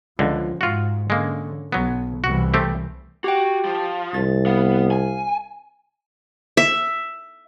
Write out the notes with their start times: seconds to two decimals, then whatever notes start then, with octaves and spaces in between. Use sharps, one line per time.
0.19 C#2 D3 F3
0.61 G#2 F4 F#4
1.10 D3 G#3 A#3 C#4
1.72 B1 F#3 B3
2.24 C2 E3 F#4
2.54 A3 C4 G4
3.24 F#4 G4 G5
3.65 F3
4.14 C2 A6
4.46 B3 F5
4.91 G#5
6.57 E5